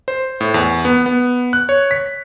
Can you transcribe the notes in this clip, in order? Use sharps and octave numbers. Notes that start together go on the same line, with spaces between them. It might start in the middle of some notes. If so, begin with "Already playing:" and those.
C5
A2
E2
B3
B3
F#6
C#5
B6